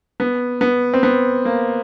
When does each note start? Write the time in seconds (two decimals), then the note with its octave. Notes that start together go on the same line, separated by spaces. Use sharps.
0.20 B3
0.61 B3
0.93 C4
1.03 B3
1.45 A#3